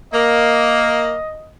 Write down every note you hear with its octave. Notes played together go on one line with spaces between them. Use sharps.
A#3 D#5